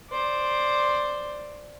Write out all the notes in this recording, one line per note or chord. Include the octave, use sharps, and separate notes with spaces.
C5 D5